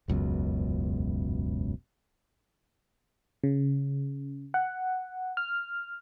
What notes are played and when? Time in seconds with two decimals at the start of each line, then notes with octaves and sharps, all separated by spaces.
0.08 E1 C#2 F#2 B2
3.44 C#3
4.54 F#5
5.37 F6